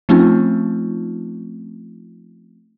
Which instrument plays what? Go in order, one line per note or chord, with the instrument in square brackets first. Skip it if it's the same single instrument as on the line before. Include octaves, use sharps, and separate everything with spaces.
[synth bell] F3 A3 C4 C#4 D#4 F4